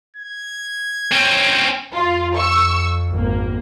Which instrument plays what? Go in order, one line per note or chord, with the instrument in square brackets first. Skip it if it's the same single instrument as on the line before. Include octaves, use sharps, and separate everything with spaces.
[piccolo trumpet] G#6
[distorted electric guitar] C4 C#4
[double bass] F2 [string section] F4
[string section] C#6 E6
G#1 A#3